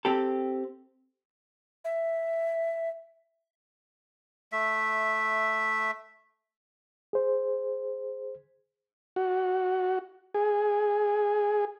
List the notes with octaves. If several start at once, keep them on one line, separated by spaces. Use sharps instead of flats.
C4 G4 A4
E5
A3 E5
G#4 C5
F#4
G#4